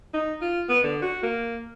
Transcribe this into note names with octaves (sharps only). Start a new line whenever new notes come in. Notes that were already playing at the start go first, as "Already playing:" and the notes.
D#4
F4
B3
D3
F#4
A#3